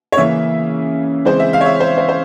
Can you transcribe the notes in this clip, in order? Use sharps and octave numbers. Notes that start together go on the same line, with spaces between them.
C#5
C#3 E3 A#3 C#4 E5
C#3 E3 G#3 C4 C5
E5
F5
C#5
E5
C5
C5
C5